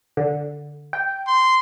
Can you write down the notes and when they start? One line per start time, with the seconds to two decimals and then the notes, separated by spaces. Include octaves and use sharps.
0.17 D3
0.93 G5
1.27 C6